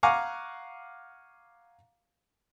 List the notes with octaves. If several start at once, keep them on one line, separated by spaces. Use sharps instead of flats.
F5 F#5 G#5 A#5 C#6 D6